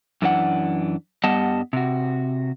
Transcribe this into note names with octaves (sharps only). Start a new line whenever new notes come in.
F#2 E3 D4 F#5
G2 G3 B3 D#5 F#5 A5
C3 F#4